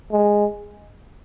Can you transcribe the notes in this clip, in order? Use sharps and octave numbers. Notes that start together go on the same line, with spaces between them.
G#3